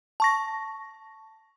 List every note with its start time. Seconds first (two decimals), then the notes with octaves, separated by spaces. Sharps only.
0.20 A5 C#6 A#6